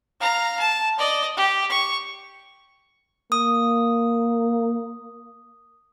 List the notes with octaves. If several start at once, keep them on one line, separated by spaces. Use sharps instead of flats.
F5 A#5
A5
D5 D#5
G4
C#6
A#3 D#6